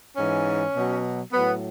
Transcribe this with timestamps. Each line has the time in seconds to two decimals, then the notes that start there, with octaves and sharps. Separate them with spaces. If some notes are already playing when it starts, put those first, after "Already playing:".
0.17 G#2 E3 C#4
0.75 B2 F#3
1.33 A2 F#3 B3